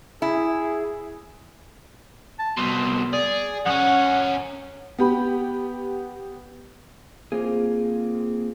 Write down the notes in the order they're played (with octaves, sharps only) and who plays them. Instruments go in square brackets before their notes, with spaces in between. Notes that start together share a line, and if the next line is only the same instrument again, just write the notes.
[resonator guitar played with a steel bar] E4 [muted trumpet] G#4
[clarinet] A5
[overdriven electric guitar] C2 B2 [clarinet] C6
[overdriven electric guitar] G#4 [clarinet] D5
[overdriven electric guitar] F#2 C#4 [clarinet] F#5
[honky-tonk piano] B3 G4 B5
[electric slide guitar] A#3 C4 F4 G#4